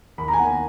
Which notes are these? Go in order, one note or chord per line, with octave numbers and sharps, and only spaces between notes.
D#2 B5
A#5
G#5
D#3 A#3 F#5